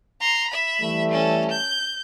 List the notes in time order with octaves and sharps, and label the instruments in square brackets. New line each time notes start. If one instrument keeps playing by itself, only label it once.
[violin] A#5 C6
E5 B5
[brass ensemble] E3 G3 A3
[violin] C#4 A4
G6